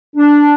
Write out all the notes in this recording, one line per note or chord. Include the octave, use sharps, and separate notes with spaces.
D4